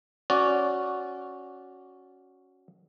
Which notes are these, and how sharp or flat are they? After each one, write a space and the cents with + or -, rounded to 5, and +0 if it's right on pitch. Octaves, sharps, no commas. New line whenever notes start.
C#4 +0 F#4 +0 D5 -15